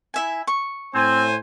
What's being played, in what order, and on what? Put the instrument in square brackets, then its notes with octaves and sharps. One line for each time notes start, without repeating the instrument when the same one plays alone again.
[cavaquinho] E4 E5 G#5
C#6
[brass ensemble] A2 C5 G#5 [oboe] C4